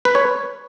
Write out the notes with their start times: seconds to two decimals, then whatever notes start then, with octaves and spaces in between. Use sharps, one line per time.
0.05 B4
0.15 C#5